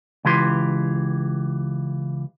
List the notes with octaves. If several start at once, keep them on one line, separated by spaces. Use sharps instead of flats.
C#2 E3 G4 C6